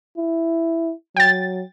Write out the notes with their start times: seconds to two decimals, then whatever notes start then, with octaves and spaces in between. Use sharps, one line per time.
0.17 E4
1.17 F#3 G5 A6